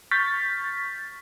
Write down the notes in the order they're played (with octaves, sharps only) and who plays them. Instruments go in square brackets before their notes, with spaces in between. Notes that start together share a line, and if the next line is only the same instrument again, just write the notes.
[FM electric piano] C#6 F6 G6 A6 B6